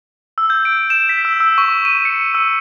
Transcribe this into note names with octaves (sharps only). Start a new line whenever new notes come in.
E6
G6
D7
E7
B6
E6
E6
C#6
D#7
C#7
E6